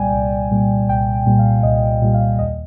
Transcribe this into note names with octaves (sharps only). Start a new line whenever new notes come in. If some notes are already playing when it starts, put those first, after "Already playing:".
Already playing: C2 A#2 G3 D5 G5 G#5
C2
A#2 G3
C2 G5
A#2 G3
F5
C2 D#5
A#2 G3
F5
D#2 D#5